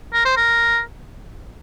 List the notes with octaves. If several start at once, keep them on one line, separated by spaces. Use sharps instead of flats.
A#4
C5
A#4